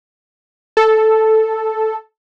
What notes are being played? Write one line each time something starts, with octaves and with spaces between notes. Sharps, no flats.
A4